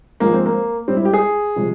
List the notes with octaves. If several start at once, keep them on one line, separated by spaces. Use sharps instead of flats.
G#2 F3 G#3 A#3
C4
A#3
G#2 G3 C4
E4
G4
G#4
C3 F3 G#3